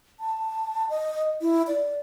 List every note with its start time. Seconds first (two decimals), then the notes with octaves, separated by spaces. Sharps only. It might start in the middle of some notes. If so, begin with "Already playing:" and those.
0.20 A5
0.90 D#5
1.41 E4
1.67 D5